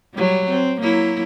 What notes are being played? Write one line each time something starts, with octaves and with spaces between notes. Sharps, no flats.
F#3 G3
C4
F#3 A#3 E4